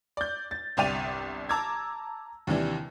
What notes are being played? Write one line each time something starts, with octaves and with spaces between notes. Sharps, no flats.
D5 G6
A6
G1 C2 D5 G5 D#7 F7
A5 A#5 D6 E6 G#6
D#2 C3 E3 D4